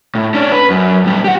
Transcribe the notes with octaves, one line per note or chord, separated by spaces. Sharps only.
A2
C#4 D4
B4
F#2
A#2 G3
G4 F#5